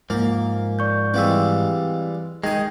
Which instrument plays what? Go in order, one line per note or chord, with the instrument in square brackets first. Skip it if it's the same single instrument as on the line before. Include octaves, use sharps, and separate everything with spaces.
[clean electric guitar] G#2 F3 [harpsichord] A#3
[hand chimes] D5 C#6 G6
[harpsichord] E3 G3 G#3 [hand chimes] C4 F5 E6
[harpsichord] D#3 D#6 [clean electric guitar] G#3 [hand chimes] G5 G#6